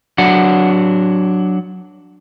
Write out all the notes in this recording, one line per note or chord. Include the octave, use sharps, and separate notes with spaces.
F#3 D4 F#5